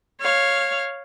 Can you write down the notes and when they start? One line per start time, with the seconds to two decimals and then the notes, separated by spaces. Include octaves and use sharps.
0.20 C#5 F5